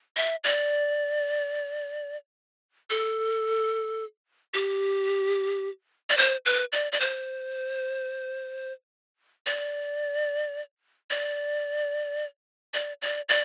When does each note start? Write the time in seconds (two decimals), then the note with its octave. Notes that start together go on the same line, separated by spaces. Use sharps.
0.16 E5
0.44 D5
2.90 A4
4.54 G4
6.10 D5
6.17 C5
6.46 B4
6.72 D5
6.92 D5
7.00 C5
9.46 D5
11.10 D5
12.74 D5
13.02 D5
13.29 D5